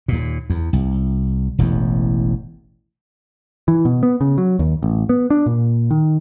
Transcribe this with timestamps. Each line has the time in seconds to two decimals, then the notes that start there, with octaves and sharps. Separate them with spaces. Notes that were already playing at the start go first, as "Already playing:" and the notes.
0.08 D#2 A#2
0.50 E2
0.73 C2
1.58 E1 A1 E2
3.68 E3
3.85 B2
4.03 B3
4.21 C#3
4.38 F#3
4.59 D#2
4.83 A1
5.09 B3
5.30 D4
5.46 A#2
5.91 D#3